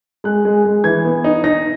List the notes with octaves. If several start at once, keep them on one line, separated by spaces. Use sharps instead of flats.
G#3 F#6
G#3
G#3
E3 G#6
B3
D#4
D#4 A#6